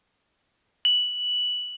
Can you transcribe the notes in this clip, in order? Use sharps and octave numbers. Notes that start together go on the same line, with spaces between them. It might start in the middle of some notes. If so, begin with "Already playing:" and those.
F#7